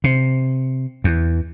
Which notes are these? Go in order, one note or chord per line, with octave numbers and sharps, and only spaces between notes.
C3
E2